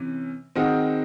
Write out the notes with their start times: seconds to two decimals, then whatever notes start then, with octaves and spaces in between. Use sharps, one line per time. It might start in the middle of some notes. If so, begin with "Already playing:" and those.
Already playing: C3 E3 C#4
0.56 D#3 G#3 C4 D#4 F#4